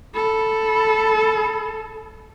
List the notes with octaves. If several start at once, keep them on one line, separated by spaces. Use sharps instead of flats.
A4 B5